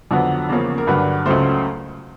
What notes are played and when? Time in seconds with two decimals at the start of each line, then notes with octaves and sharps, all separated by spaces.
0.11 F2 D3 F#3 B3
0.49 E2 C#3 F3 A#3 C#4
0.78 A#4
0.87 G2 D3 F#3 B4
1.26 C#2 C#3 F#3 A3 C5